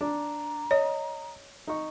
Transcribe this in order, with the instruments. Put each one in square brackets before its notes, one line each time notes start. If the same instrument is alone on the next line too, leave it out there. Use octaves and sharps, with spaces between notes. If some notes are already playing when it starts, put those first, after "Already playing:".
[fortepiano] D4 [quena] A#5
[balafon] C#5 [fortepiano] D#5
[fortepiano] D#4 C#6